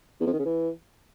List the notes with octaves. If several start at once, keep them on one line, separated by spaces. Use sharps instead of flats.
E2
F2
D#3
C#3
E3